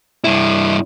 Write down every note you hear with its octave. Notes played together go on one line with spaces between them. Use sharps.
G2 E4